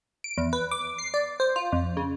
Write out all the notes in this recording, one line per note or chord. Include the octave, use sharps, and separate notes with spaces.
D7
E2
B4
D6
C7
D5
C5
F4
F2
C#3